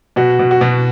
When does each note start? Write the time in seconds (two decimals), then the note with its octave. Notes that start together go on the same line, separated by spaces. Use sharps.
0.16 B2 F#4
0.39 B2
0.51 F#4
0.61 B2